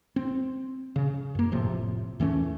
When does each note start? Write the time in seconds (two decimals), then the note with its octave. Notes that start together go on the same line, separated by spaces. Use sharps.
0.16 C4
0.96 C#3
1.35 F#2 A#3
1.52 F1 A2 C3 F3
2.20 E2 E3 A3 C#4